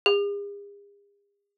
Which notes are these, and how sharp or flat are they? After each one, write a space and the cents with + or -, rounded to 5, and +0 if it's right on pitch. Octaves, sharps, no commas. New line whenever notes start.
G#4 -45